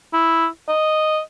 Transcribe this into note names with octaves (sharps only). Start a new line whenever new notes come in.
E4
D#5